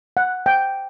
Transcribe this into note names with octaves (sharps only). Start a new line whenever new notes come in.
F#5
G5